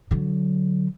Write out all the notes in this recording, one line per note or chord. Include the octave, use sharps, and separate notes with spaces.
D3 F#3